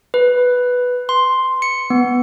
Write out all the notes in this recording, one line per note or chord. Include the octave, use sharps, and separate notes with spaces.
B4
C6
C#7
B3